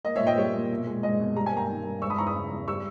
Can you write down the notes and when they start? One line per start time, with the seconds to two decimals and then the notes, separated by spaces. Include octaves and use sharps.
0.04 A#3 D#5
0.16 C#5 E5
0.21 A#2
0.27 D#5 G5
0.38 G3 C#5
0.54 A#2
0.71 B2
0.87 G#3
1.03 G#3 D#5
1.20 B2
1.36 G3 A#5
1.46 G#5
1.53 A#3 G5 A#5
1.69 D#3
1.85 G2
2.02 G#3 C#6 E6
2.10 B5 D#6
2.18 E2 A#5 C#6
2.27 B5 D#6
2.35 C#3
2.51 E2
2.68 G3 C#6 E6